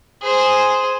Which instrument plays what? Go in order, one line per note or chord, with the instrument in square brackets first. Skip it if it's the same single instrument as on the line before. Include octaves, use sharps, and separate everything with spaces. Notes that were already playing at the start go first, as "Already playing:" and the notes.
[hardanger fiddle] G#4 C5